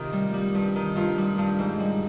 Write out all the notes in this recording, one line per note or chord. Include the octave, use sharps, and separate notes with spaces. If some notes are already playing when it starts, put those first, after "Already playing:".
Already playing: C3 D#3 F4 G4
G3
G3
G2
D#3
G2 F4
G3
G2
G#2
G3